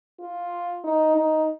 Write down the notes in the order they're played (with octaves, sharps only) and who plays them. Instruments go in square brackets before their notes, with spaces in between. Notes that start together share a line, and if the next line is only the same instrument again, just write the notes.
[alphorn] F4
D#4
D#4